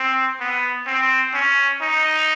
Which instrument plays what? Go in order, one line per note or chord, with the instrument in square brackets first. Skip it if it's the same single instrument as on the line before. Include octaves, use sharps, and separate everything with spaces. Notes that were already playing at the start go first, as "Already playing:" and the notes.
Already playing: [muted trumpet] C4
B3
C4
C#4
D#4